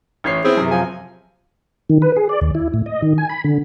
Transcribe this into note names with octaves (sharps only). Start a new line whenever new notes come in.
A1 C#5 C7
B3 C4 E4 G#4
F#2 C3
F3 G#5
D#3
B4
G#4
D5
D#2
E4
A2
D#5
D#3
G#5
B5
D3